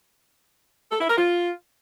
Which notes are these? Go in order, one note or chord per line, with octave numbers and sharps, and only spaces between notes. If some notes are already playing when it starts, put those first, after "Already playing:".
A4
E4
A#4
F4